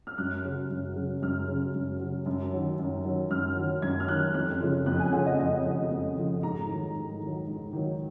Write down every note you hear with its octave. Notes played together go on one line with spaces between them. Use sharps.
F6
F#2 F#6
C#3 F#3
F#2
C#3 F#3
F#2 F6
C#3 F#3
F#2
C#3 F#3
F#2
D#3 F#3
F#2
D#3 F#3
F#2 F6
D#3 F#3
F#2 G#6
F6
D#3 F#3 F#6
F2 F#6
C#3 F3
F2 F#6
G#5
C#3 F3 F#5
D#5
F2 D#5
C#3 F3
F2
C#3 F3
G#2 A#5
D#3 F#3
G#2
D#3
F#3
G#2
D#3 F#3